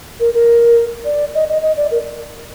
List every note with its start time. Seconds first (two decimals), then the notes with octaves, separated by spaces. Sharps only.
0.20 A#4
0.34 A#4
1.05 D5
1.35 D#5
1.49 D#5
1.62 D#5
1.77 D5
1.91 A#4